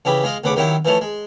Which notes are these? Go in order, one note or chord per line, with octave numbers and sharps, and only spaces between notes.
C#3 E3 G4 B5
G#3 F4 D#5
D2 C#3 B4 F#5 D6
D#3 F#3 E4 F#4 G4
E3 F3 A3 C#5
G#3